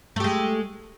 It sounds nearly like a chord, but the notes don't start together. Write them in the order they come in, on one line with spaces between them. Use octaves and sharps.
A3 G4 G#3